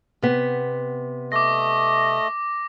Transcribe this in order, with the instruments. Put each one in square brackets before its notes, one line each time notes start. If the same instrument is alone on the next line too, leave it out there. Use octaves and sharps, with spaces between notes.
[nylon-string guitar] C3 B3
[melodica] A3 D#5 [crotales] D6 A#6